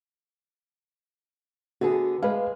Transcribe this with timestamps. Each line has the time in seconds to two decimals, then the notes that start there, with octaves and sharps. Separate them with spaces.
1.81 D3 B3 F#4 G#4
2.22 G#3 B4 F5